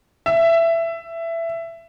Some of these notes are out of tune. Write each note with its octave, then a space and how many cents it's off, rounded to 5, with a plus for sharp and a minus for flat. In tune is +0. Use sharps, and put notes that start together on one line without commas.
E5 +15